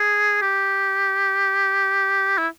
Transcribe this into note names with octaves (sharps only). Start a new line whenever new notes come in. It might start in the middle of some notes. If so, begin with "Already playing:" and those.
Already playing: G#4
G4
E4